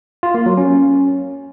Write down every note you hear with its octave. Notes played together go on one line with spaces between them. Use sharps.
F4
A#3
F#3
C#4